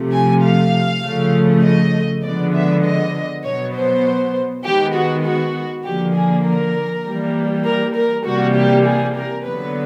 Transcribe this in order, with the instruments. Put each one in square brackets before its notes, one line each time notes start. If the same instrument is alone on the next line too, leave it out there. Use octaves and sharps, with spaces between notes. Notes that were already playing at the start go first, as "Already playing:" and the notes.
Already playing: [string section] C3 F3 A3
G#5
F5
C#3 F3 A3
D#5
D3 F3 G#3 B3 D5
E5
D#5
B2 F#3 B3 C#5
C5
D#3 G#3 B3 G4
F#4
F#4
D3 F3 A#3 G4
G#4
A#4
E3 G3 A#3
A#4
A#4
C3 E3 G3 A#3 F#4
G4
G#4
A#4
D3 F#3 B3 B4